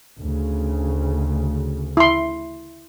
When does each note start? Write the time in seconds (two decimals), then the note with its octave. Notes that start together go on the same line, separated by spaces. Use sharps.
0.19 D2 C#3
1.97 E4 C6